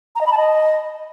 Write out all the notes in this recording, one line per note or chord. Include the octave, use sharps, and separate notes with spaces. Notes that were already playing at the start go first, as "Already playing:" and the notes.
A#5
D#5
B5
A5
D#5